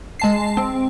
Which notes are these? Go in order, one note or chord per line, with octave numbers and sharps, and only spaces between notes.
G#3 A5 C7
C4